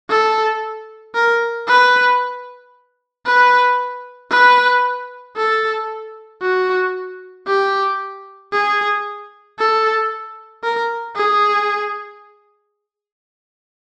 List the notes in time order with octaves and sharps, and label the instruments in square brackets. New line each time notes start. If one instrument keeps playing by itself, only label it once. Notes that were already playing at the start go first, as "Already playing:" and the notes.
[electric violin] A4
A#4
B4
B4
B4
A4
F#4
G4
G#4
A4
A#4
G#4